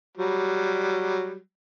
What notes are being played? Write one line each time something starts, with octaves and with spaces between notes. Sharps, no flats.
F#3 G3